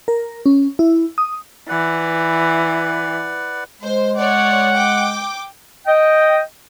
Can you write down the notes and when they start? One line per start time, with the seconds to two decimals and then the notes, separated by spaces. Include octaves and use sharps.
0.08 A#4
0.46 C#4
0.79 E4
1.18 D#6
1.69 E3 B4 D5 F#5
3.82 G#3 C5
4.17 C#5 D5 F#5
4.74 G5 D6
5.87 D#5 G5